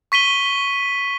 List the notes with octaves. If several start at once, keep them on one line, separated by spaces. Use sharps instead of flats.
C#6 B6 D#7 G7